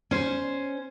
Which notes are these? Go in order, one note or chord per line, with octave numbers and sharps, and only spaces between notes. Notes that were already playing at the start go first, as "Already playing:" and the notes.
C#4 C5